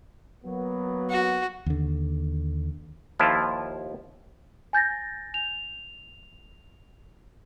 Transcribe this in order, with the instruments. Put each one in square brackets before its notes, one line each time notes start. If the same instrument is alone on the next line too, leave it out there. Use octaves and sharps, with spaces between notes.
[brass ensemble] F#3 A#3 B3
[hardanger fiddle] F#4
[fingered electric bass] D#2 D3
[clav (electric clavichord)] D#2 F3 E4 F4 A5
[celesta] G#5 G6 A6 A#6
F7